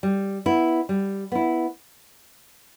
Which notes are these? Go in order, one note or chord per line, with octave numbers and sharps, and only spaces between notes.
G3
B3 E4
G3
B3 E4